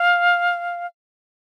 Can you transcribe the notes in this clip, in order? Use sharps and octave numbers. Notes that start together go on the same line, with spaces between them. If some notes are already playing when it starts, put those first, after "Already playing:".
Already playing: F5